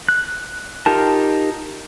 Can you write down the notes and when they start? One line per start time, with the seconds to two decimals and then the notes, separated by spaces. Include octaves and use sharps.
0.09 F#6
0.86 D#4 F4 G4 A#4 A5